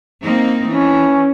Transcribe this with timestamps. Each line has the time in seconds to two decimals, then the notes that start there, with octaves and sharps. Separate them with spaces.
0.22 A#3 C4 D#4
0.67 E3 C#4